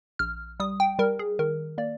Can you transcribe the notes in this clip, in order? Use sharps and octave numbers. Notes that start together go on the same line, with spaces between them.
A#1 F6
G3 D#6
G5
G3 A#4
G#4
D#3 A#4
A#3 D5